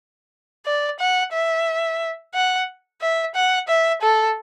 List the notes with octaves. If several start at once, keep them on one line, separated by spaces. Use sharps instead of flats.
D5
F#5
E5
F#5
E5
F#5
E5
A4